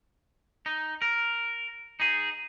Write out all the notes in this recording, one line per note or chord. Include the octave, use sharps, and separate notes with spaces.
D#4
A#4
D#4 G#4